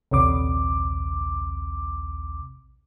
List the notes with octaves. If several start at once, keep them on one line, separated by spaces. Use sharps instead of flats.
A#1 D#2 C3 D6